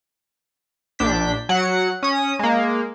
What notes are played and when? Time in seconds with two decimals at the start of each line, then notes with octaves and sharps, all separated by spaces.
0.99 A#1 D4 G6 B6
1.49 F#3 F#5 C#7
2.03 C#4 D#6
2.39 G#3 A#3